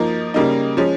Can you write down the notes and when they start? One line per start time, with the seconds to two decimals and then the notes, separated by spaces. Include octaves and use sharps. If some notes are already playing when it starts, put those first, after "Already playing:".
Already playing: F3 A#3 D#4
0.34 C#3 G3 A#3 D#4
0.77 F3 G#3 C#4